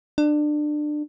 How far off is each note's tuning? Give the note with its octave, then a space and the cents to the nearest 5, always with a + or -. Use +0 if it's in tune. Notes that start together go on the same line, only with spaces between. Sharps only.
D4 +25